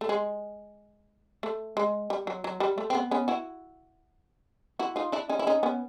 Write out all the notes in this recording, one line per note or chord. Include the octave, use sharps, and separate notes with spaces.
A3
G#3
A3
G#3
G3
F#3
F#3
G3
A3
C4
B3
B3 C#4
E4 F#4
E4 F#4
D#4 F4
D4 E4
C#4 D#4
E4
C#4 D#4
B3 C#4